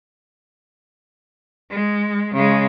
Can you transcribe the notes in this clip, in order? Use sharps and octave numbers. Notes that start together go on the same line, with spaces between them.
G#3
C#3 G#3